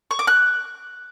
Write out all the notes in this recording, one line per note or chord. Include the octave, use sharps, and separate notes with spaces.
C#6
D6
F#6